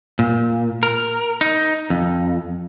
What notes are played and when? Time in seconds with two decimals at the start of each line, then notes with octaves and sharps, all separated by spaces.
0.19 A#2
0.83 A#4
1.41 D#4
1.90 F2